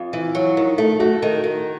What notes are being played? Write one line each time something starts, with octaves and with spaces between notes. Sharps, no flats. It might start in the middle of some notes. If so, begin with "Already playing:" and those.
Already playing: F2 F4
E3
F#3
D#3
A3
A3 F#4
D#3
D#3